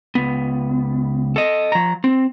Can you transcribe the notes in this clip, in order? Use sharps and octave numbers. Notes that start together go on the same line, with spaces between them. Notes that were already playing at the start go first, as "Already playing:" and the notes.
C#2 B3
A4 D#5
F3 A#5
C4